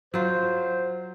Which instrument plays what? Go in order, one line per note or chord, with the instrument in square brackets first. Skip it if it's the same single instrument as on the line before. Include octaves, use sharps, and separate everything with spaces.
[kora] F#3 F4 [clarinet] C5